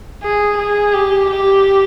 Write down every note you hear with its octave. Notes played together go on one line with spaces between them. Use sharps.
G#4
G#4
G4
G4